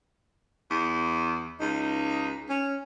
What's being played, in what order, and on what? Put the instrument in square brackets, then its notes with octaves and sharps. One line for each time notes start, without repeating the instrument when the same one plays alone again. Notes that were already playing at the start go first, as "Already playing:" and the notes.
[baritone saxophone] E2
[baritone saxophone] C#2 [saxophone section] D#4
[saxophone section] C#4